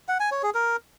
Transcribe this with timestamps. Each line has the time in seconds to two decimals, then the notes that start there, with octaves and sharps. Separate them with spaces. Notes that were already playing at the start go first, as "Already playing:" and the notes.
0.08 F#5
0.20 G#5
0.31 C#5
0.43 G#4
0.54 A#4